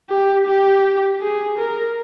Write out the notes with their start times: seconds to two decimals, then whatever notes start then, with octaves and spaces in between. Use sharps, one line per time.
0.09 G4
0.46 G4
1.20 G#4
1.58 A#4